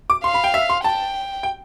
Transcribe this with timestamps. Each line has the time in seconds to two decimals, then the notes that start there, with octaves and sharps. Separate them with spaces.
0.10 D6
0.24 F5 C6
0.34 B5
0.44 G5
0.54 E5
0.70 C6
0.84 G5 A5
1.43 G5